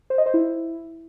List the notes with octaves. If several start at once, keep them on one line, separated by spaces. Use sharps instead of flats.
C5
D#5
C5
E4